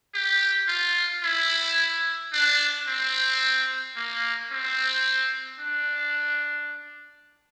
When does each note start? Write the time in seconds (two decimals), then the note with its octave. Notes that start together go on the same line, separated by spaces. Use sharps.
0.14 G4
0.68 F4
1.23 E4
2.33 D4
2.88 C4
3.96 A#3
4.52 C4
5.60 D4